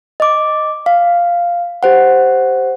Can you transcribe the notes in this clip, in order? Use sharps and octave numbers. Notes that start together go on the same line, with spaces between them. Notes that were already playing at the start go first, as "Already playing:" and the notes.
D#5 D6
F5
G4 C5 F#5